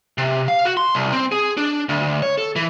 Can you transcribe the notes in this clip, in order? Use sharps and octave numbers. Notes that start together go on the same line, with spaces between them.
C3
F5
F#4
C6
C2
C4
G#4
D4
D2
C#5
A4
E3